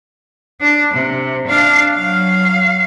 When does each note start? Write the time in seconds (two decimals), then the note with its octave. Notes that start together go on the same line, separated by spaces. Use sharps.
0.61 D4
0.93 C3
1.47 D4 F5
1.95 F#3 F5